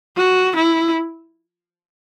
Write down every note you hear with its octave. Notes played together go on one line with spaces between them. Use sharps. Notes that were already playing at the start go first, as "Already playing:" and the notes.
F#4
E4